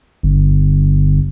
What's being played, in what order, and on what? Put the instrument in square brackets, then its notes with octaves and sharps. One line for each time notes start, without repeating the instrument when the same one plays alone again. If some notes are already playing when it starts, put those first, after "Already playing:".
[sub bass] G1